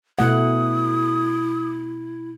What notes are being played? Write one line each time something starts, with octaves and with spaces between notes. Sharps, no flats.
B2 A3 E4 F#5 D#6